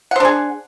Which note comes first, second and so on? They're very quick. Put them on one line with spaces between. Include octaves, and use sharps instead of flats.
F#5 C5 D4 G#4